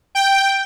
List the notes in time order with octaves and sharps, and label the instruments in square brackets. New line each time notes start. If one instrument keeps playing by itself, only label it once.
[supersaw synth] G5